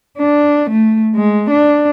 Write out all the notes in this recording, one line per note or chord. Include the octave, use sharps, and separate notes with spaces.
D4
A3
G#3
D4